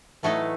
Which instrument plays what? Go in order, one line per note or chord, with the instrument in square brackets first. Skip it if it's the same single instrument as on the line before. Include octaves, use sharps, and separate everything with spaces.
[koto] A2 F#3 A3 D#4 A4 [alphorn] E3